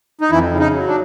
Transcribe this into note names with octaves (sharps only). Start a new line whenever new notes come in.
D#4
F2 E3 E4
C#3
D#4
F#3
D4